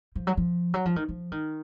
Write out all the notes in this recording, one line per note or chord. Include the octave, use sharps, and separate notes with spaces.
F3
F#3
F3
F#3
F3
D#3
F3
D#3